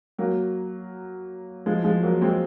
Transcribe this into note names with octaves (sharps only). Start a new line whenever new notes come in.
F#3 A#3
F3 G#3
F3 G#3
F#3 A#3
G#3 C4